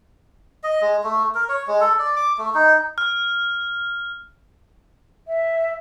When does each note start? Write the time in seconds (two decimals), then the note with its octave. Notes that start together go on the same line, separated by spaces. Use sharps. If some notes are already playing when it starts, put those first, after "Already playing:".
0.63 D#5
0.81 G#3
1.04 A3
1.35 A#4
1.49 C#5
1.67 G#3
1.81 A4
1.99 D5
2.16 D6
2.38 A3
2.54 D#4
2.98 F6
5.28 E5